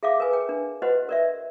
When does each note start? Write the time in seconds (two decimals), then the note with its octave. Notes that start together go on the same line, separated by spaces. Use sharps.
0.03 G#4 E5 F5 D6
0.20 A#4 B4 G#5
0.33 G5
0.49 D4
0.82 F#4 B4 C5 D#5 F#5
1.09 A#4 D5 E5